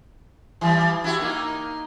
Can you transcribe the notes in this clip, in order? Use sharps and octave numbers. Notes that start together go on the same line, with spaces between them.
E3 G3
E4 F#4 G4
A#3 D#4